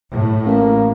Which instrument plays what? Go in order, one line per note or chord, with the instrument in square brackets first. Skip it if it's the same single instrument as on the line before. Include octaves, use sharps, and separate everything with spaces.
[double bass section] A2
[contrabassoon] A1 [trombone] A#3